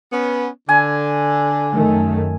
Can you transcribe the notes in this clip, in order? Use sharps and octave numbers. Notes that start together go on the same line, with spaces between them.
B3 C#4
D3 G#5
F#2 D#3 A3